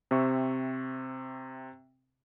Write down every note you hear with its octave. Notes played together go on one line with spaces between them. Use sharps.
C3 C4 E5 C#6